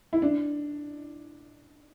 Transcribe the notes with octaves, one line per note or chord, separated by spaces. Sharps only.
E4
D4